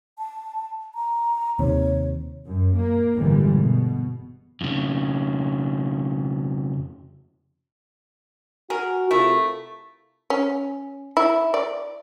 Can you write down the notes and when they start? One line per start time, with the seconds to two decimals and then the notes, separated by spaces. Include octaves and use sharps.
0.18 A5
0.95 A#5
1.59 D#2 C3 C#5
2.46 F#2
2.77 A#3
3.15 G1 A2 D3 E3 G3 G#3
3.53 B2
4.61 F2 C#3
8.70 F#4 G#4 A#4
9.11 C3 A3 E4 F4 A#4
10.30 C#4
11.17 E4
11.54 D5